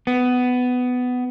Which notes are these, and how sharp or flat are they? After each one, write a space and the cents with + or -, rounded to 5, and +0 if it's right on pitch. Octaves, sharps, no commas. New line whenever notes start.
B3 +15